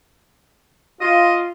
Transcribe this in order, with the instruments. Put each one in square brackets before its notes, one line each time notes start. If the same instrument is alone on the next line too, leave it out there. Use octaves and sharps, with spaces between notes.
[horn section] F4 [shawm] D#5